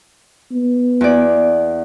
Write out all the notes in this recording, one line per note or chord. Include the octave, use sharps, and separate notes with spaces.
B3
E2 D5